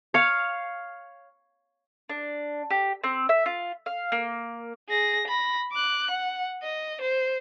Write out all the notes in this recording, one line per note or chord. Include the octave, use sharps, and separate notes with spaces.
C#5 F5
D4
G4
C4
E5
F4
F5
A#3
G#4 A#6
B5 A#6
D6 F#6
F#5
D#5
C5